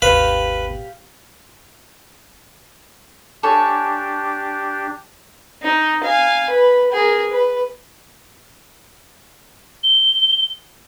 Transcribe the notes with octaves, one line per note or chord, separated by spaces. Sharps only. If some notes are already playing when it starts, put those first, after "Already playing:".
G#1 D#2 G4 B4 F5
D4 G4 A4 C#5 G#5
D#4
F5 G#5
B4
G#4 A#4
B4
G7